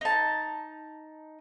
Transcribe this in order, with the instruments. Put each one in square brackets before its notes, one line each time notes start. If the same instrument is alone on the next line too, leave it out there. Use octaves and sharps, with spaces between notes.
[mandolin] D#4 A5